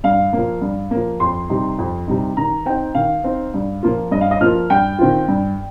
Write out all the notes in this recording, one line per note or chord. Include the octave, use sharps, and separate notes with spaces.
G2 F5
F3 A#3
G2
F3 A#3
F2 C6
C3 G3 D#4
F2
C3 G3 D#4
D#3 A#5
C4 D#4 G5
D#3 F5
C4 D#4
G2
F3 A#3 F4
G2 D#5
F5
D#5
F3 A#3 F4 F6
G2 G5
D#3 C4 F4
G2